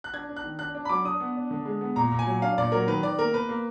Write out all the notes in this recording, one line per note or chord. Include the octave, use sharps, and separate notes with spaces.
F#6
D4 G#6
D4
F#6
D#3
D4 F#6
D4
B5
F#3 D6
D4 D#6
B3
D4
D3
G#3
B3
A#2 A#5
A#2
G#5
F#3
D4 F5
A#2 D5
F#3 A#4
D#3 B4
D#3 D5
A#3 A#4
A#3 B4
A#3